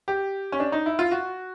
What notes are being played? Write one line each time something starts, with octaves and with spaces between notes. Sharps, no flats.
G4
C#4
D4
D#4
E4
F4
F#4